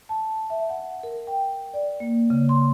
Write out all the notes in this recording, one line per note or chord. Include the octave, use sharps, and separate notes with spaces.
A5
E5
F#5
A#4
G5
D5
A#3
C#3
C6